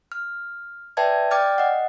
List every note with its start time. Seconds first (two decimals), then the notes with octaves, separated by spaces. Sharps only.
0.12 F6
0.97 B4 D5 E5 G5 A5 G#6
1.31 D5 G5 D6 F6 A6
1.58 D#5 F#5